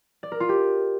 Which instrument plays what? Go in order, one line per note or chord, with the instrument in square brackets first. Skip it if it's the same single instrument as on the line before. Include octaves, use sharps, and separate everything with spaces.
[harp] D5
A#4
F4
G4